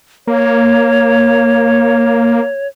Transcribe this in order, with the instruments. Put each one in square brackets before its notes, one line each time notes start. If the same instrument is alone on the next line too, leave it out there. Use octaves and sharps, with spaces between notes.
[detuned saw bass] A#3 [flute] C#5